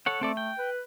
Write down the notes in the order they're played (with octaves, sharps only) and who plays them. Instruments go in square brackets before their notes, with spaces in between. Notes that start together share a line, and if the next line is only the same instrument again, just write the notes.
[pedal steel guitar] A4 C#5 F#5
[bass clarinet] A3 [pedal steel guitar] C4 A4 D5
[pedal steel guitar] G5
[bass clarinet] B4